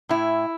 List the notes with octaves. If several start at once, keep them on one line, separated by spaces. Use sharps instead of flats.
A2 E4